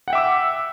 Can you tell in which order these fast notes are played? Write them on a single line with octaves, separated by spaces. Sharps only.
F#5 G5 E5 D6 E6